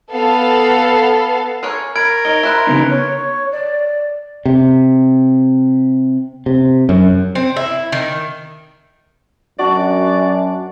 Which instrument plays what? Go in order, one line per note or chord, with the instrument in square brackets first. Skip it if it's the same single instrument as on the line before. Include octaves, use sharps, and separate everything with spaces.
[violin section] B3 A4 F5
[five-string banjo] G#4 A#4 C#5
[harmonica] A#4 [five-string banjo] B5 [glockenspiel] F6 G#6 D7
[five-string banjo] D#4 C#5 [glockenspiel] G7
[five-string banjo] E4 C5 B5 [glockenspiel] A#5 F#6
[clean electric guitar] C#3 B3 D#4
[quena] C#5
D5
[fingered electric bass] C3
C3
F#2
[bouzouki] C4
E4
D#3
[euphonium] F#2 [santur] D4 F#4 [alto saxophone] D5